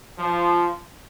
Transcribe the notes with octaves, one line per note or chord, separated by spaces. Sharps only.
F3